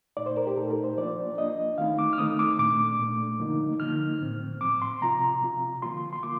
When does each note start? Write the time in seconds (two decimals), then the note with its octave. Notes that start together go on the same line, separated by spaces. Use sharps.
0.17 A#2 A3 D#4 D5
0.26 C5
0.37 A#4
0.47 G4
0.57 A#2 A3 D#4 A4
0.70 A#4
0.84 C5
0.97 F3 A#3 D4 F4 D5
1.38 F3 A#3 D4 F4 D#5
1.78 D#3 A3 C4 D#4 F5
1.99 D6
2.13 F6
2.18 D#3 A3 C4 D#4 D#6
2.39 D6
2.59 A#2 A3 D4 D6
2.99 A#2 A3 D4
3.40 D3 F3 A#3 D#4
3.80 D3 F3 A#3 D#4 F6
4.21 A2 F3 C4
4.61 A2 F3 C4 D6
4.82 C6
5.01 C3 F3 C4 F4 A#5
5.42 C3 F3 C4 F4
5.82 D3 F3 A#3 F4 C6
6.13 C6
6.23 D3 F3 A#3 F4 D6